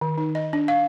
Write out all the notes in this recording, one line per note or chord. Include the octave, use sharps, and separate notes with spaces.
D#3
D#4
D#5
D4
F5